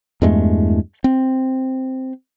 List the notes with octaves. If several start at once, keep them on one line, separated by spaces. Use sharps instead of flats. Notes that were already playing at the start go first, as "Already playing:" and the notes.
E2 G2 G#3 A3
C4